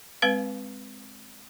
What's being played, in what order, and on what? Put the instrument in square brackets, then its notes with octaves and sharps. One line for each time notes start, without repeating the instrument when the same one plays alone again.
[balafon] G#3 C4 B4 F5